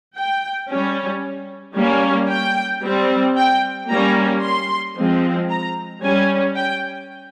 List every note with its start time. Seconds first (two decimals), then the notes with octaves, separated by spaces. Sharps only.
0.16 G5
0.70 G3 C#4
1.76 G3 A#3 C#4
2.29 G5
2.82 G3 C4
3.36 G5
3.89 G3 A#3 C#4 A#5
4.42 C6
4.96 F3 G#3 C4
5.49 A#5
6.02 G3 C#4 G#5
6.56 G5